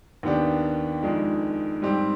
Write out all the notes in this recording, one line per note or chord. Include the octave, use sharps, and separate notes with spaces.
D#2 D#3 B3 D4 G4
F2 D#3 G#3 D4
G#2 G3 C4 G4